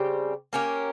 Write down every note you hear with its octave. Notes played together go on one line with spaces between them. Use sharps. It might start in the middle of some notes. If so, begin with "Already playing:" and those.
Already playing: C#3 G3 C4 G4
A#3 C#4 G4 A#4